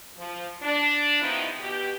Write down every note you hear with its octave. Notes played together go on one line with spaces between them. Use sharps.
F3
D4
C3 D#3 F3 B3 D#4 E4
B2 G4